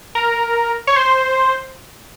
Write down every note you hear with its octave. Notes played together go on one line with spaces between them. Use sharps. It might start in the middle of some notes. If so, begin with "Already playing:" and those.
A#4
C#5
C5